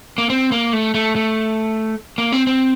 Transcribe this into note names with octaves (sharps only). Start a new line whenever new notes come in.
A#3
C4
A#3
A3
A3
A3
A#3
C4
C4